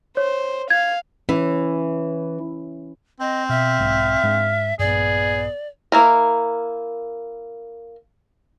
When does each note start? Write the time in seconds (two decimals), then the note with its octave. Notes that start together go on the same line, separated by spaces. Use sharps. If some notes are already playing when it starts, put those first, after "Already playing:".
0.17 C5 C#5
0.70 F5 G#6
1.29 E3 C#4
3.20 C4 D#5
3.49 B2 E5 F5
3.80 B1 G#2
4.23 G#2 G#3 D4
4.79 A#1 G2 B3 G#4 D5
5.92 A#3 E4 A#4